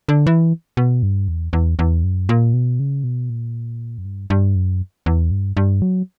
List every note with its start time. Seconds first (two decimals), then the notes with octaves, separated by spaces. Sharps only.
0.09 D3
0.27 E3
0.77 B2
1.03 G2
1.28 E2
1.53 E2
1.79 E2
2.04 F#2
2.29 A#2
2.54 B2
2.80 C#3
3.04 B2
3.30 A#2
3.98 F#2
4.05 G2
4.30 G2
4.55 F#2
5.06 E2
5.31 G2
5.57 G2
5.82 F#3